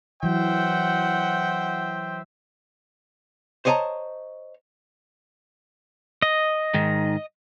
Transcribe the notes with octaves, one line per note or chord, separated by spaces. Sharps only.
E3 F#3 C5 E5 F#5 G5
C5 C#5 D#5 F5 A5 A#5
D#5
G#2 D#3